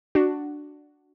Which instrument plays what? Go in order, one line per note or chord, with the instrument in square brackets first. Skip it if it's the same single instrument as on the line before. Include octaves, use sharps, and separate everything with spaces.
[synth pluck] D4 F#4